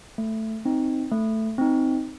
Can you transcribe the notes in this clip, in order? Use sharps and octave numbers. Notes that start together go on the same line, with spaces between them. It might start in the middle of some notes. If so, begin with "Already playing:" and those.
A3
C4 D#4
A3
C4 D#4